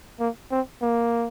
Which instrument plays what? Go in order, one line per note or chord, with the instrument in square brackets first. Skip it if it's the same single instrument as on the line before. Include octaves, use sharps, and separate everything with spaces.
[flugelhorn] A#3
C4
A#3